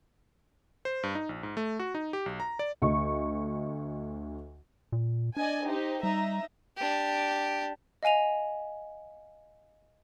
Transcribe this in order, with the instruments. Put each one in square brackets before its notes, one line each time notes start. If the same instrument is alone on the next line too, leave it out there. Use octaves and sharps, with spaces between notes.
[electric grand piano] C5
G2
D#4
A#1
G#2
A3
F#4
D#4
G4
B1
A#5
D5
[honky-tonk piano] D2 D#5 C#6
[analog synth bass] A#2
[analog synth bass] D4 [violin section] D5 D#5 G#5
[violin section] D#4 G4 C5
[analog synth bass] G3 [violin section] D#4 E5 A#5
[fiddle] D4 G4
[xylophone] D#5 F5 G#5 D#7 F7